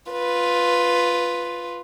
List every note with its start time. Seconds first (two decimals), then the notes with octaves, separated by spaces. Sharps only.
0.11 F4 B4